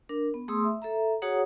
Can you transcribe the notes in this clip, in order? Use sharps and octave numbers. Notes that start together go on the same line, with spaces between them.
D4 A#4
B3
A3 G#4 A5 C6 D#6 E6
E5
A4 E5 A#5
F#4 G#4 C#5 F#5 A#5 D#6